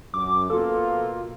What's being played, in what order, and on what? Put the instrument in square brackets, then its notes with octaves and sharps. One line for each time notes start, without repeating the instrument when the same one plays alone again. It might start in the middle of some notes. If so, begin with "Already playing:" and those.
[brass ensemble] F#2 [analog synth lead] D6
[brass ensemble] B2 A#3 F4 [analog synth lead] A4